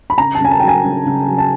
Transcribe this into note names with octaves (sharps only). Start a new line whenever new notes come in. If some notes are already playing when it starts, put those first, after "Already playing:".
B5
C#3 A#5
A5
C#3 G#5
A5
F#3 G5
G#5
C#3
C#3
F#3
A5